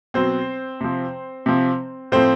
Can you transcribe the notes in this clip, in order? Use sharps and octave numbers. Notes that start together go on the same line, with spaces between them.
B2 F#3 C4 C5
C3 F3
C3 F3
A2 F3 C4 C5